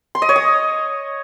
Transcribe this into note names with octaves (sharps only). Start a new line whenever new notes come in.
C6
D#5
C#5
D#6